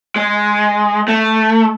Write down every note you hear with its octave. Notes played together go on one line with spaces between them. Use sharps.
G#3
A3